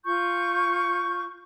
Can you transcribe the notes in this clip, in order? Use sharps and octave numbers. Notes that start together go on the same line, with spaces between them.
F4 C#6 G6